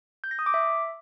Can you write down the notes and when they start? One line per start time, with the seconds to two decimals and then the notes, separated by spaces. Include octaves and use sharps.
0.24 G6
0.31 A#6
0.39 D#6
0.46 D6
0.54 E5